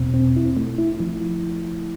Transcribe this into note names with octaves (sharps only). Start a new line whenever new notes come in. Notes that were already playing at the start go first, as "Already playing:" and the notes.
Already playing: E2 B2 C4
C4
E4
A3
E4
F3